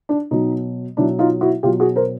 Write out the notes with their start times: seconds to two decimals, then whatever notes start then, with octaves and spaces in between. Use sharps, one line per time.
0.09 D4
0.31 B2 F#3 D#4
0.97 B2 F#3 D4 E4
1.19 D#4 F4
1.41 E4 F#4
1.63 B2 F#3 F4 G4
1.80 F#4 G#4
1.96 A#4 C5